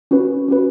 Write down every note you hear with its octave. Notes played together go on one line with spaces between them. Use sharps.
C#4 F#4 B4
C#4 F#4 B4